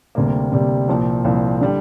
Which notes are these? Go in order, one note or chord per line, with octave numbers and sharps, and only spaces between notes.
D2 C3 G3 A#3
D2 C3 G3 A#3
C2 A#2 F3 A#3
C2 A#2 F3 A#3
D3 G3